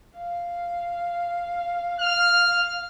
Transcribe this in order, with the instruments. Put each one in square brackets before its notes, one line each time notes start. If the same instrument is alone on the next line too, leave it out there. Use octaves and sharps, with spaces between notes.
[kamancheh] F5
[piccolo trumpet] F6